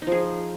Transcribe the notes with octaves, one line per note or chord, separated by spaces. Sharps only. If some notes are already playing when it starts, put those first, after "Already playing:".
F3 D#4 G#4